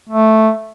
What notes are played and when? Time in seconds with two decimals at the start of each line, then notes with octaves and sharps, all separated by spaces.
0.09 A3